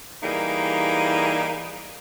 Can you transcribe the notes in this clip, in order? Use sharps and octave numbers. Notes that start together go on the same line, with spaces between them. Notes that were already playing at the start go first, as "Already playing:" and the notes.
E3 G3 A#3 D#4 G#4